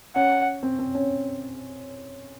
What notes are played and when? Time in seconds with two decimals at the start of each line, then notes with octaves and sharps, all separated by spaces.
0.15 C#4 F#5
0.63 C4
0.79 C4
0.95 C#4